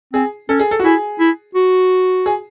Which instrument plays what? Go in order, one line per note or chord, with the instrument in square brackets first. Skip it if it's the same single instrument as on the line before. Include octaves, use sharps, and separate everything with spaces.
[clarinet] C4 [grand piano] G#4
[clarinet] C#4 [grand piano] A4
[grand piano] G#4
A4
F#4
[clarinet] E4 [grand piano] G#4
[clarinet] E4
F#4
[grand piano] G#4